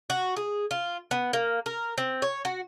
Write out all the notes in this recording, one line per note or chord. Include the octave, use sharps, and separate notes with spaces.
F#4
G#4
F4
B3
A#3
A#4
C4
C#5
F#4